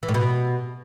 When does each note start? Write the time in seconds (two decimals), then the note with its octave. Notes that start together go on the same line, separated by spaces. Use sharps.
0.03 E3
0.09 A2
0.14 B2